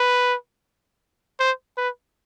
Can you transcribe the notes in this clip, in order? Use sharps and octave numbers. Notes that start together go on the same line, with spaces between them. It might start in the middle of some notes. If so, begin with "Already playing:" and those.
Already playing: B4
C5
B4